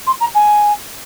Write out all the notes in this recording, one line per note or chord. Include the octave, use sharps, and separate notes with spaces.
C6
A#5
G#5